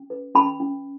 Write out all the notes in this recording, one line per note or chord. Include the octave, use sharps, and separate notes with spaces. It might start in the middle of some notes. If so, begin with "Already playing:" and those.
Already playing: C#4
B4
C#4 B5
C#4